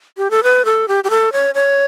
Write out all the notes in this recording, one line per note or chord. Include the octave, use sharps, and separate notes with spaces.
G4
A4
B4
A4
G4
G4
A4
C#5
C#5